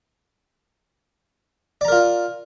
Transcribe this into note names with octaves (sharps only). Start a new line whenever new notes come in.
F4 A#4 D5 A#5